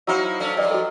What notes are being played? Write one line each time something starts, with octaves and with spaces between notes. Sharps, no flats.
F#3 D#4 E4 C5 E5 F5
A3 C#4 D4
F3 G3 B4 D5 D#5
F#4 A4